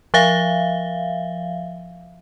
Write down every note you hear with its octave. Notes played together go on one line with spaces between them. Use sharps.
F3 E5 F5